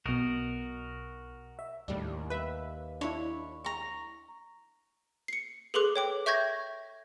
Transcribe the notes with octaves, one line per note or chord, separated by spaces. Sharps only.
B1 B2 F#4 A#4 D#5
E5
D#2 A2 G3 D4
B4 E5
D4 E4 C#5 B5
A#5 C#6
C7 C#7
G#4 A4 B4 C6 D6 F#6
C#5 G5 D6
E5 C#6 G6 G#6 A#6